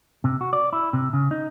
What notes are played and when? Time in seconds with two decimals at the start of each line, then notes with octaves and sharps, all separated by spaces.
0.24 C3
0.41 F#4
0.53 D5
0.73 E4
0.93 C3
1.13 C#3
1.31 D#4